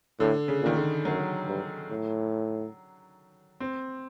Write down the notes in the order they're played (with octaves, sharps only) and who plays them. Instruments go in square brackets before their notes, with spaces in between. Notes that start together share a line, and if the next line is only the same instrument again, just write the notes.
[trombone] A2 [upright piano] D3
[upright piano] C#3
[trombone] A#2 [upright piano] D#3
[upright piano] D3
[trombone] F#2 [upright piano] F#3
[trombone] G2
A2
[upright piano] C4